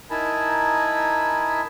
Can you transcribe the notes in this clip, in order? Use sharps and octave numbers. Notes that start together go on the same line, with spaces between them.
D#4 E4 A#4 G#5 A5 B5